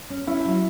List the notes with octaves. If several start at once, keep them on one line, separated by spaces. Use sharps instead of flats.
C#4
C#4 E4
F#3